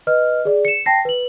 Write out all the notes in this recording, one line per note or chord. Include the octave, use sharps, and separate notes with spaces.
B4 D#5 F6
G#4 D5
C#7 E7
G5 A5 A#6 C7
B4 F#7